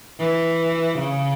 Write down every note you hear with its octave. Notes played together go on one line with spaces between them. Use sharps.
E3
C#3